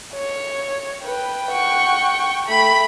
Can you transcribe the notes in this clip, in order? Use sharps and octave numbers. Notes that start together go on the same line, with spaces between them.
C#5
B4 G5
F#5 C#6
A3 G5 B5